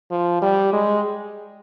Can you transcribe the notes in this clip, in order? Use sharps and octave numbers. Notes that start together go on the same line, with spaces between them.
F3
G3
G#3